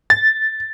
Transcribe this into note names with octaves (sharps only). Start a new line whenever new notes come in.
A6